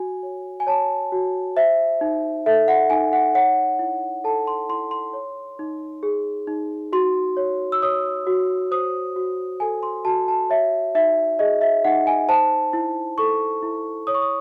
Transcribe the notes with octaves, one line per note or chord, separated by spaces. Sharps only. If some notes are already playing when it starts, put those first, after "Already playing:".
Already playing: F#4 G#5
C#5
G#5
C#5 A5
F#4
C5 E5
D#4
A4 E5
F#5
D#4 G#5
F#5
C#5 F#5
E4
A4 A5
C6
E4 C6
C6
C#5
D#4
G#4
D#4
F#4 C6
C#5
E6
C#5 D#6
F#4
C5 D#6
F#4
A4 G#5
C6
F#4 A5
A5
C#5 E5
D#4 E5
G#4 D#5
E5
D#4 F#5
G#5
C5 A5
E4
A4 C#6
E4
C#5 D#6
C#6
D#6